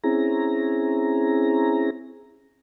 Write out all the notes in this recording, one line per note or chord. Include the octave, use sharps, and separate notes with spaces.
C4 C#4 E4 G#4 A#5